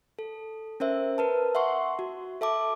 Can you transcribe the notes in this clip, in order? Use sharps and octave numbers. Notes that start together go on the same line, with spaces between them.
A4
C#4 A#4 C5 E5
A#4 B4 A5
E5 F#5 C6 C#6
F#4
A4 E5 A5 D6